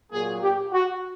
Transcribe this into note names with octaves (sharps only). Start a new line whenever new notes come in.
A#2 F#3 A#3 G#4
G4
F#4